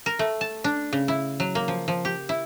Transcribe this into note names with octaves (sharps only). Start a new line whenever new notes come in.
A#4
A3
A5
D4
C#3
E4
F#3
A#3
F3
F3
G4
E4